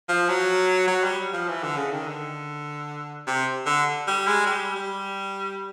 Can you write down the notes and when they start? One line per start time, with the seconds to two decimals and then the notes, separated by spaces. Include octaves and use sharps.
0.09 F3
0.29 F#3
0.87 F#3
1.04 G3
1.33 F3
1.48 E3
1.63 D3
1.77 C#3
1.92 D#3
2.07 D3
3.27 C3
3.66 D3
4.07 G3
4.27 G#3
4.46 G3
4.76 G3